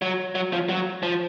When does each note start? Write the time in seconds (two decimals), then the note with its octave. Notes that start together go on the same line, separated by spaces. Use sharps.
0.02 F#3
0.35 F#3
0.53 F3
0.69 F#3
1.03 F3